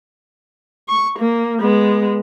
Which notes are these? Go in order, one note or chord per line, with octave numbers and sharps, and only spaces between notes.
C#6
A#3
G#3 B3